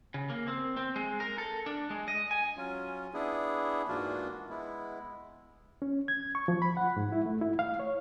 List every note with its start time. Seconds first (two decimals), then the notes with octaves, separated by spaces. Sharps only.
0.14 C#3
0.30 A#3
0.48 C4
0.77 C4
0.96 G#3
1.20 A#4
1.38 A4
1.66 D4
1.91 G#3
2.08 D#5
2.31 G#5
2.57 F#3 C#4 F4
3.14 B3 D4 E4 G#4
3.88 G#2 E3 A#3 D4 F4 F#4
4.49 G#3 B3 E4
5.82 C#4
6.08 G#6
6.35 C#6
6.48 F3
6.62 B5
6.77 F#5
6.97 G#2
7.12 E4
7.26 A3
7.41 E4
7.59 F5
7.79 C#5